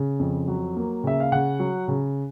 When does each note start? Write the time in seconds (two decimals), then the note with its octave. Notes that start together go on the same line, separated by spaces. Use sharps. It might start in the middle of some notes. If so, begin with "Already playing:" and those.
Already playing: C#3
0.19 F2
0.48 F#3
0.76 A#3
1.04 C#3 E5
1.20 F5
1.32 C#3 F#5
1.59 F#3
1.88 C#3